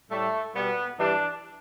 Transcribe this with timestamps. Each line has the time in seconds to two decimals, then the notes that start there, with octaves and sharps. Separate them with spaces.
0.10 A2 G3 A3
0.54 B2 G3 B3
0.97 G2 E3 G3 D4